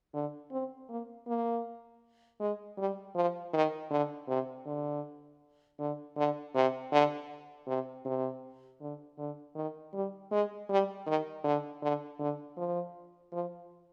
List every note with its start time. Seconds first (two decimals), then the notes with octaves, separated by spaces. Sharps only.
0.14 D3
0.51 C4
0.89 A#3
1.27 A#3
2.40 G#3
2.78 G3
3.15 F3
3.53 D#3
3.91 D3
4.28 C3
4.66 D3
5.79 D3
6.17 D3
6.55 C3
6.92 D3
7.67 C3
8.05 C3
8.81 D3
9.18 D3
9.55 D#3
9.93 G3
10.31 G#3
10.69 G3
11.07 D#3
11.44 D3
11.82 D3
12.20 D3
12.57 F3
13.33 F3